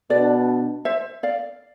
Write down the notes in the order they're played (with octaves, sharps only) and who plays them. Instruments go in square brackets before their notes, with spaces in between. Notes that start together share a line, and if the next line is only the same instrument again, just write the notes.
[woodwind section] B2 B3 D4 [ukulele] B4 D5
[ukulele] C5 E5
D5 F5